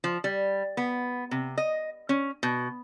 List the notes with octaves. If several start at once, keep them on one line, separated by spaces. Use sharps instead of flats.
F3
G3
B3
C3
D#5
C#4
B2